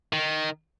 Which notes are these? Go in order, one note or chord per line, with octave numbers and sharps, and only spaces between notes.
D#3